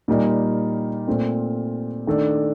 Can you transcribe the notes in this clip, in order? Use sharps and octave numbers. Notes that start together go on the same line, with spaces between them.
A#2 G3 A#3 D#4
A#2 A3 C4
D#3 A3 D4 A4 D5